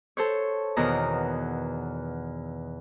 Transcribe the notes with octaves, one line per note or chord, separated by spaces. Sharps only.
A4 C5 C#5
E2 B2 D#3 A#5